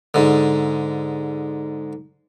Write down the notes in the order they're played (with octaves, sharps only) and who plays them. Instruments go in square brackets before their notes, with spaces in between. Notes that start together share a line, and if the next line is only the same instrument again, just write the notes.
[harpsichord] G#2 D3